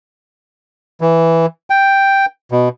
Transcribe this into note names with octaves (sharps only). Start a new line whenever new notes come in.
E3
G5
B2